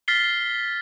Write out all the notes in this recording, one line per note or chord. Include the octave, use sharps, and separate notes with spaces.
F6 A6 B6 C7 G7